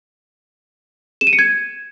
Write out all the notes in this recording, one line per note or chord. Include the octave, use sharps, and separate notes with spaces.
E7
D#7
C#7
G#6